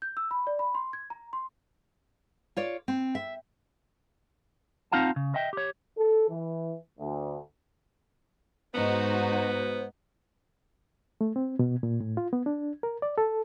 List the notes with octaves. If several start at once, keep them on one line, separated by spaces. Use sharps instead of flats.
G6
E6
B5
D5
B5
C6
G#6
A#5
C6
F4 C#5 D5
C4
E5
C4 D#4 F4 F5 F#5 A5
C#3
D#5 E5 G5
G4 C#5
A4
E3
D2
G#2 B3 D#4 F#4 C5
A3
C4
B2
A#2
A2
F4
B3
D4
A#4
D5
A4